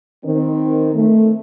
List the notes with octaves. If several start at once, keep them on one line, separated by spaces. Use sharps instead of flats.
D#3 C4
A3